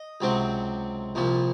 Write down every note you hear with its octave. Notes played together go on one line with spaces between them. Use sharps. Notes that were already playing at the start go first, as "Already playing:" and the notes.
Already playing: D#5
C#2 C3 F#3 C4
C2 A#2 F3